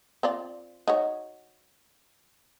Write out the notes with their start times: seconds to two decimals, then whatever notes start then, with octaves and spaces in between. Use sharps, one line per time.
0.23 C4 F4 D5
0.88 D#4 F#4 C#5